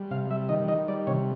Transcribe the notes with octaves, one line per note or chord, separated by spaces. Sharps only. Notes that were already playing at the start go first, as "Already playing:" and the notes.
Already playing: G3
C3 F5
G3 E5
D#3 D#5
D#3 D#5
G3 D5
C3 C#5